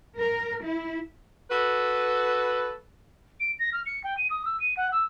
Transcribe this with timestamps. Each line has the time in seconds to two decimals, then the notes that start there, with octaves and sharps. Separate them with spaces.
0.17 A#4
0.63 E4
1.50 F#4 A4 B4
3.39 D7
3.58 A#6
3.72 F6
3.86 C#7
4.03 G5
4.17 D#7
4.30 D#6
4.45 E6
4.59 D#7
4.76 F#5
4.92 E6